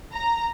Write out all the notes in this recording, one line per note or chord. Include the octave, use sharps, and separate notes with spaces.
A#5